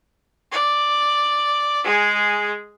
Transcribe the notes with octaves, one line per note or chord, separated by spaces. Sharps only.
D5
G#3 G#4